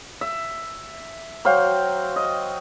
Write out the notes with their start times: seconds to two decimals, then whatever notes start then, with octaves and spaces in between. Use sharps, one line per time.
0.21 E5
1.45 F#3 C5 F5 G5
2.16 D#5